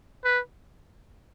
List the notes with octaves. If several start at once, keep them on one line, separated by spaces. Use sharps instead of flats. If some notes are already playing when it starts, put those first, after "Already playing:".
B4